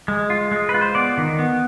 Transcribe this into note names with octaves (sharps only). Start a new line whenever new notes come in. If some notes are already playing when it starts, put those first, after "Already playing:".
G#3
F4
G#3
B4
F4
C5
B3 D5
D#3
B3